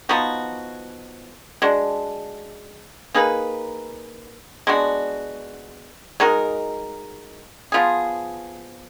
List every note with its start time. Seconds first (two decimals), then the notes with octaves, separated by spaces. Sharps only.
0.09 F3 B3 D#4 F#4
1.62 G#3 D4 F#4
3.14 A#3 D#4 G#4 B4
4.67 G#3 B3 D4 F#4
6.20 G#3 D#4 F#4 A#4
7.72 F3 B3 F4 G#4